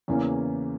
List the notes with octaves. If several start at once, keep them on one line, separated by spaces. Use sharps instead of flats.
E2 C#3 E3 A#3 C#4